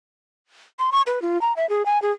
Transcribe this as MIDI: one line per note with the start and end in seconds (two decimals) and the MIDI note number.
0.79 0.90 84
0.92 1.02 85
1.07 1.22 71
1.22 1.40 65
1.41 1.55 82
1.56 1.68 76
1.69 1.85 68
1.86 2.01 80
2.02 2.12 68